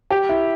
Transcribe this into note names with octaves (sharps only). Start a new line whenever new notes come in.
G4
E4